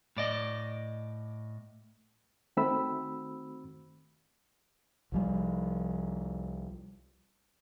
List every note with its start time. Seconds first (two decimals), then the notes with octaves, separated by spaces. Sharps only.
0.17 A2 D5 D#5
2.57 D#3 A3 C4 F#4 B5 E6
5.12 C2 F3 G3